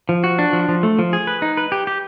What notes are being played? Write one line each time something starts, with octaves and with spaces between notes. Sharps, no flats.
F3
F#4
D4
F3
F3
A3
F3
G#4
B4
D#4
B4
G4
G4